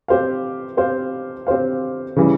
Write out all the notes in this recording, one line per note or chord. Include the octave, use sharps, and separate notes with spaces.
C4 G4 C5 F5
C4 G4 C5 F5
C4 G4 C5 F5
C#3 E3 G3 C#4